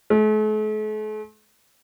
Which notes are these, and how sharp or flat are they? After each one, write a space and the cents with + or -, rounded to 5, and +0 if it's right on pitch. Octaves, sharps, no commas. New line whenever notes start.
A3 -45